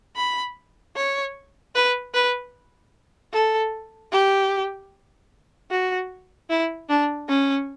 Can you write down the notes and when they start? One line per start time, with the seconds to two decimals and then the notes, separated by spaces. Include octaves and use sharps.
0.16 B5
0.96 C#5
1.75 B4
2.14 B4
3.33 A4
4.12 G4
5.71 F#4
6.50 E4
6.89 D4
7.29 C#4